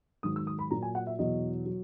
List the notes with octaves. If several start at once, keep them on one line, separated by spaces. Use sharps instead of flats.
G#2 D#3 F#3 D#6
E6
D#6
B5
A#2 F#3 A#5
G#5
F#5
E5
E2 B2 F#3 D#5
F#3